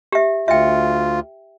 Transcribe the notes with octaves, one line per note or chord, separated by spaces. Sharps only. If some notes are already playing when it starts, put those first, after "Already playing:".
G4 E5
D2 F4 E5 G5